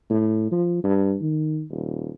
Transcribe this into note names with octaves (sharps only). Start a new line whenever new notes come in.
A2
F3
G2
D#3
D#1